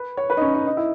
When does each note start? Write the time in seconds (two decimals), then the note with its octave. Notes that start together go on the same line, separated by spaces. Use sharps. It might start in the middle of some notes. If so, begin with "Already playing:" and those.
Already playing: B4
0.17 C#5
0.30 B4
0.37 D#4
0.42 C#4
0.55 D#4
0.67 D#4
0.77 E4